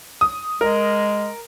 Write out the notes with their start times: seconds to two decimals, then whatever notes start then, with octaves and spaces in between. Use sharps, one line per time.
0.21 D#6
0.61 G#3 A#4